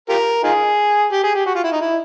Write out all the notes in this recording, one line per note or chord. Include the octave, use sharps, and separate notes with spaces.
F4 G4 A#4
D#4 F4 G#4
G4
G#4
G4
F#4
F4
E4
D#4
E4